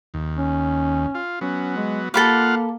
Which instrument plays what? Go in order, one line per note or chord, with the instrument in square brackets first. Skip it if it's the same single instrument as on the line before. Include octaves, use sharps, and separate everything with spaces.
[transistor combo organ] D#2
[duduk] C#4
[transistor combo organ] F4
[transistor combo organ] F#3 B3 [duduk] C#4
[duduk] G#3
[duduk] A#3 [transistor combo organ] F4 F5 F#5 [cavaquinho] A4 B5 D6